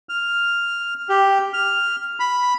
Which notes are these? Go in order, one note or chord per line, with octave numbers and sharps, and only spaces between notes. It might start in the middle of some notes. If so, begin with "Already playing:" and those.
F6
G4
F6
B5